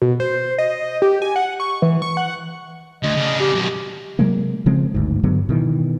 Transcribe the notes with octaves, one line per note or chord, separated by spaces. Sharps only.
B2
C5
D#5
G4
G#5
F#5
C#6
E3
C#6
F#5
D2 D#5
C#3 D4
G4
F#2 B2
C3 F#3 G#3 A#3
C#3 F3 G#3 C4
G1 D2 G#2
G2 D3 F#3 B3
B2 D#3 E3